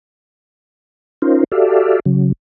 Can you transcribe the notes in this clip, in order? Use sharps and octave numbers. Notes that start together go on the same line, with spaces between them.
C#4 D#4 F4 A#4 C5
F#4 G4 A4 D5 E5 F5
C#3 F#3